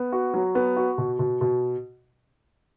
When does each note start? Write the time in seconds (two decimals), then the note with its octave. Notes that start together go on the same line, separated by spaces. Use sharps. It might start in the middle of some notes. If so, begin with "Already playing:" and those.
Already playing: B3
0.12 F#4
0.34 F#3
0.55 B3
0.77 F#4
0.98 B2
1.19 B2
1.41 B2